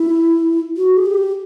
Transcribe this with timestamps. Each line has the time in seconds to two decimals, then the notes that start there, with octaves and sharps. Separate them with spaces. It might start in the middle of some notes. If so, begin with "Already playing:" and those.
Already playing: E4
0.77 F#4
0.97 G#4
1.06 G4